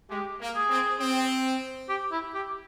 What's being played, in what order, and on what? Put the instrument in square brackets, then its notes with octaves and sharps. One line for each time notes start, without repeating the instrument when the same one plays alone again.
[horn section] G#3 [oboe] G4
[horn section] A#3
[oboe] G#4
[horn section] C4
C4
[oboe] G4
E4
G4